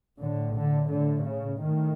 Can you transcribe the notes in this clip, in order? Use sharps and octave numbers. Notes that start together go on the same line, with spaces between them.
A2 D3
D3
A2 D3
C#3
A2 D#3